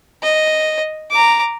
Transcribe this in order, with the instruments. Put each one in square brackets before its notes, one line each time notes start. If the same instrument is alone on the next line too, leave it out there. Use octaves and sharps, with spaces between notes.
[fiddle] D#5
A#5 D6